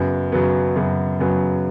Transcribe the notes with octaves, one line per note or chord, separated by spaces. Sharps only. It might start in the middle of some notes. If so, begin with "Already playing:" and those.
Already playing: F#2 C#3 F#3 B3
F#2 C#3 F#3 B3
F#2 C#3 F#3 B3
F#2 C#3 F#3 B3